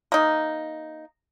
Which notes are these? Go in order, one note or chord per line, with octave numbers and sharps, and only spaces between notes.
A#3 D#4